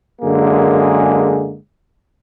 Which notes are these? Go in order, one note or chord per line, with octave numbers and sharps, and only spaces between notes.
F#2 D3 G#3 A#3 G#4